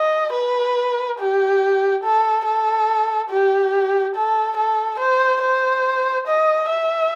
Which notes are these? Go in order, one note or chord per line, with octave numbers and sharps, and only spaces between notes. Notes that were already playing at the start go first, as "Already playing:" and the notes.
Already playing: D#5
B4
G4
A4
A4
G4
A4
A4
C5
C5
D#5
E5